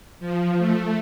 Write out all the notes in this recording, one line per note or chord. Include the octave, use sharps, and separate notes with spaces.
F3
A3